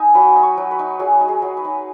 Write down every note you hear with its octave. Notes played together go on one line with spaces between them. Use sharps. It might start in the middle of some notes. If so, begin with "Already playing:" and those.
Already playing: D#4 G#5
F#3 B5
D#4
C#6
F#3
B4
D#4
F#3 G#4
D#4
G#4
F#3
B4
D#4